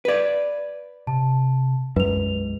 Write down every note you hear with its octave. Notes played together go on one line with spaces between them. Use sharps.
B4 D5
C3 A5
B1 F#2 G#3 B4 F7